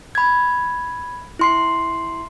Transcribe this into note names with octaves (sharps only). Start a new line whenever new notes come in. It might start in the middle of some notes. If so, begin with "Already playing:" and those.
B5 G#6
E4 C6 C7